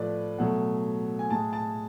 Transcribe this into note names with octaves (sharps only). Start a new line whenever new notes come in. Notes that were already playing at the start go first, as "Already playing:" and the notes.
Already playing: A2 F3 A3 B4 D5
B2 F#3 A3 F#5
G#5
A2 G#3 A5
A5